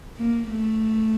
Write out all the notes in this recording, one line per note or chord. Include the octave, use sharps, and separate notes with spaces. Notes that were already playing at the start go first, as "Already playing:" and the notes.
A#3
A3